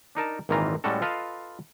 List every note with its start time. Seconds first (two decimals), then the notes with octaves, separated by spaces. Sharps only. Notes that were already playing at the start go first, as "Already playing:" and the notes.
0.15 D4 D#4 A#4 A5
0.49 G#1 A#2 D#3 E3 F4 A#5
0.84 A2 G3 G#3 C#4 F#4 A4
1.02 F4 A4 B4 D#5 F5